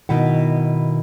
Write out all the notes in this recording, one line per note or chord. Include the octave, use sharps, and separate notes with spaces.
B2 D#3 E4 F#5